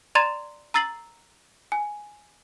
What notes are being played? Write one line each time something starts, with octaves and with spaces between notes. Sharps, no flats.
D5 A#5 C6 G#6 A6 E7
A#5 E6 A6 C7 F#7
G#5